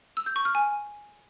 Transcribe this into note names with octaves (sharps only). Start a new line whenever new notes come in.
E6
G6
C#6
F6
G#5